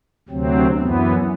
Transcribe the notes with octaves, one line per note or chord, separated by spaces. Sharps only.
D2 C3 F#3 C4
F#2 E3 B3